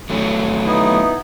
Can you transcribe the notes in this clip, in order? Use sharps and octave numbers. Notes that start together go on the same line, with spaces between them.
F#3 A3 C#4
B3 D#4 E4